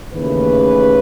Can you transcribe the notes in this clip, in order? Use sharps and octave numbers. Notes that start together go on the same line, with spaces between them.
D#2 C#3 E3 A3 B4